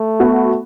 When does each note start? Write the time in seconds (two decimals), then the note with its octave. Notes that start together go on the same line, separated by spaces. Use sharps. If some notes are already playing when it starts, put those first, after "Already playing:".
Already playing: A3
0.20 B3 F#4